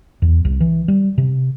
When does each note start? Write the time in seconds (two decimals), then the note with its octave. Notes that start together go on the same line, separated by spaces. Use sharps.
0.22 E2
0.45 C2
0.60 E3
0.88 G3
1.18 C3